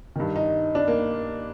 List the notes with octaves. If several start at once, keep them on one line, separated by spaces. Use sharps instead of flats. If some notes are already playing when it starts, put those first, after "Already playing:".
G2 D#3
D#4
D4
A#3